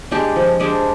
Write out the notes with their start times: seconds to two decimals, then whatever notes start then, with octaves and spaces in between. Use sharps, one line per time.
0.11 G#3 D4 G4
0.36 F3
0.60 G#3 D4 G4